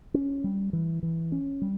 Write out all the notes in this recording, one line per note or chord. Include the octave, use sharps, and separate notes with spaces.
C#4
G3
E3
E3
C#4
G3